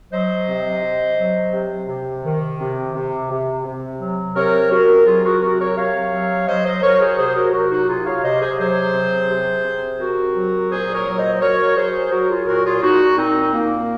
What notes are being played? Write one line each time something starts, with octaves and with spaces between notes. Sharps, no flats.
F#3 C5 D#5
C3
C3
F#3
C3
C3
D#3
C3
C3
C3
C3
F#3
C3 A#4 C#5
C3 F#4 A#4
F#3 F4 G#4
F#4 A#4
C3 F#4 A#4
A#4 C#5
C3 C#5 F5
F#3
F#3 C5 D#5
C5 D#5
F#3 A#4 C#5
G#4 C5
C3 G#4 C5
F#4 A#4
F#3 F#4 A#4
D#4 F#4
C3 F4 G#4
C#5 F5
C3 C5 D#5
G#4 C5
F#3 G#4 C5
C3
C3
C3
C3 F#4 A#4
F#3
A#2 G#4 C5
A#4 C#5
F#3
C5 D#5
D#5
F#3 A#4 C#5
F#3 G#4 C5
F#3 F#4 A#4
F4 G#4
A#2 F#4 A#4
F4 G#4
A#2 D#4 F#4
A#2 C4 D#4
A#2 A#3